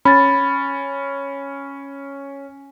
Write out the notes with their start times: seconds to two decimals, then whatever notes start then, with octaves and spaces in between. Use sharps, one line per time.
0.05 C#4 B5 A6